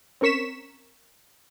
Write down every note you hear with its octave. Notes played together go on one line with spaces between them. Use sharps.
C4 C#4 A#4 C#6 B6 E7